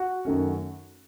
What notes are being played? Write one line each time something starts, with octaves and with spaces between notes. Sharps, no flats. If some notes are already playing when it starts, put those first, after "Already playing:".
Already playing: F#4 F#5
F#2 D#3 A3 C#4